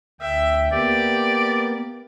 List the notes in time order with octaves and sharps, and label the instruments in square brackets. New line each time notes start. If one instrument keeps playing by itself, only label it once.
[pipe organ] D2 G5 [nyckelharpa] E5
[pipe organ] A#3 B3 [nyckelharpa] G4 [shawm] D5